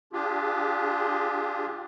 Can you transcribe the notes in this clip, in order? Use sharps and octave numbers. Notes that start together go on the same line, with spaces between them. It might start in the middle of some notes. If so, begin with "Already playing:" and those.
D4 F4 G4 G#4